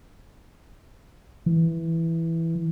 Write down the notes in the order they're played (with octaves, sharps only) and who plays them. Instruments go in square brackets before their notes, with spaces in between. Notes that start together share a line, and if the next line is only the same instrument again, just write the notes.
[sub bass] E3